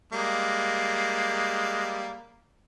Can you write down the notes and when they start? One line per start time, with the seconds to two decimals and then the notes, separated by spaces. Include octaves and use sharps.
0.12 G3 G#3 A#3